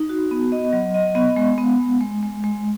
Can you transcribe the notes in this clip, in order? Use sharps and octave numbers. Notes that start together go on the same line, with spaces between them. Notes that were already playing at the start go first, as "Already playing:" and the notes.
Already playing: D#4
F#4
B3
D#5
F#3
D#5
B3
G#3
B3
G#3
G#3
G#3
G#3